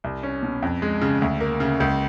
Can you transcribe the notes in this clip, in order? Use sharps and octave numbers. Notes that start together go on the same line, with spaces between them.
C2
C#4
B2
F2
G#3
C#3
D2
A#3
C#3
C#2